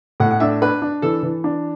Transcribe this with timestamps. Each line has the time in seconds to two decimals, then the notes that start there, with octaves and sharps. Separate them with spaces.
0.20 A2 F#5
0.31 F#5
0.40 D4 E5
0.62 D4 B4
0.82 D4
1.02 E3 A4
1.23 E3
1.44 D4